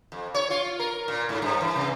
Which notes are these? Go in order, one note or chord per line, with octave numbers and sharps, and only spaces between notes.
F2
C#5
F4
A#4
A#2
G#2
G2
E3
C3